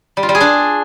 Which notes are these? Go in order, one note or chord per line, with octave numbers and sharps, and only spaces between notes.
G3
F4
G3
G#4
D4